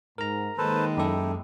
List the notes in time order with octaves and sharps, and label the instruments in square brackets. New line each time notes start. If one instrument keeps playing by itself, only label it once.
[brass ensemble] G#2 [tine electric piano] A#4 A#5
[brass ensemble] D#3 [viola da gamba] G#3 A#3 [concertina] A4 B4 C5
[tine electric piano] F#2 A4 [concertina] D#4 E4 G4